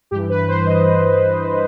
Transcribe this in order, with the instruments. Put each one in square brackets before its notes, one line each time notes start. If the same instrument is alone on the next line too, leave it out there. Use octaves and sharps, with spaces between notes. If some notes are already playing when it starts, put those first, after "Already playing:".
[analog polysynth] G2 E3 G4
B4
C5
D#5